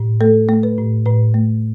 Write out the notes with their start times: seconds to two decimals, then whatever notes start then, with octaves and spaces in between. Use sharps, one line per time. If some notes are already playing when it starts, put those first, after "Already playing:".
Already playing: A2
0.21 A3 A4
0.49 A3
0.63 B4
0.78 A2
1.06 A2 B4
1.34 A3